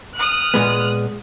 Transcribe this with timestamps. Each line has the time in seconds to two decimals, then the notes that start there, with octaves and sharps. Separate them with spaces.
0.16 D#6 F6 F#6
0.54 A#2 G#3 B3